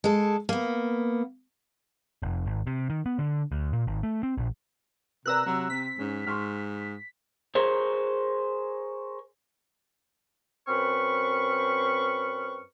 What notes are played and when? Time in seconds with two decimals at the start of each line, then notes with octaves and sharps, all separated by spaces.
0.04 G#3 A4
0.49 A#3 B3
2.22 F1
2.47 G#1
2.67 C3
2.90 D#3
3.06 B3
3.19 D3
3.52 D2
3.73 A#2
3.87 G#1
4.03 A3
4.23 C4
4.38 A#1
5.26 C3 A#4 B4 D5 A#5 E6 F#6
5.46 C3 F#3
5.70 C3 C4 B6
5.99 G#2 C#4
6.27 G#2 C6 C#6 F6
7.55 G#4 A#4 C5 C#5
10.68 F#2 C4 B4 B5 C#6 F6